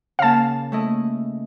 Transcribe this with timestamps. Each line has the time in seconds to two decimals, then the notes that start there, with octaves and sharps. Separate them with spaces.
0.19 C#3 A#3 F5 A5
0.72 A3 E4 D#5